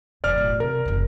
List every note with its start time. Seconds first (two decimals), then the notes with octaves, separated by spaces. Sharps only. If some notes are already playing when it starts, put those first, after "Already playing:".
0.24 E1 F#2 D5 F6
0.38 A1 F4
0.60 C3 A#4
0.85 F#1 E2